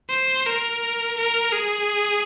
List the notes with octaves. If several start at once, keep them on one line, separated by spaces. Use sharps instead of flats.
C5
A#4
A#4
G#4